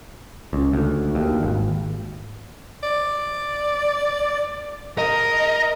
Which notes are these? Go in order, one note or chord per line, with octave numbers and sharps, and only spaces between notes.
C#2
D2
D#2
G#1
D5
A#4 D#5